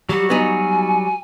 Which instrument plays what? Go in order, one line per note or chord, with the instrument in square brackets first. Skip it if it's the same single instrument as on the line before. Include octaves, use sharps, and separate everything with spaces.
[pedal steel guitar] F#3 G3 F#4 [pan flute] G4
[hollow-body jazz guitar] B3 D#4 [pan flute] G#5